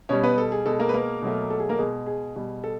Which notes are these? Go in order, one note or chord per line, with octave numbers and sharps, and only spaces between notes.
B2 G3 C#4 C#5
B3 B4
A4
G#4
B2 G#3 A4
A#3 A#4
B4
A#3 A#4
B2 F#3 A3
A4
G#4
A#3 A#4
B2 G#3 G#4
G#4
B2 G3
A4